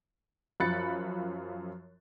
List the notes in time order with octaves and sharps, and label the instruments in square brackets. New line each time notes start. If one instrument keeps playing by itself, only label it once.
[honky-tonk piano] F#2 F3 B5 F#6 A6 C#7